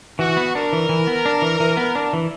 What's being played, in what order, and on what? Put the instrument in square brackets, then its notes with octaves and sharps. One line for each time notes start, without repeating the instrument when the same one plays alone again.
[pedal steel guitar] E3 [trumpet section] F#4
[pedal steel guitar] B3
[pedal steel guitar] D4 [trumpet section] A#4
[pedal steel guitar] E3
E3
B3
D4
E3
E3
B3
D4
E3